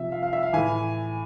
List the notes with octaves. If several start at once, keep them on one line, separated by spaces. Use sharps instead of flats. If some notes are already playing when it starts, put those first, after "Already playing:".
Already playing: C3 F3 E5
F5
F5
E5
F5
A2 E3 G#5